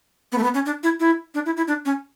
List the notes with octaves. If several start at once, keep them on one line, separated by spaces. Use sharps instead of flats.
B3
A3
B3
C#4
D4
E4
E4
D4
E4
E4
D4
C#4